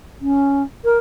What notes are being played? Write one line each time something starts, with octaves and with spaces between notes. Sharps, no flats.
C#4
A#4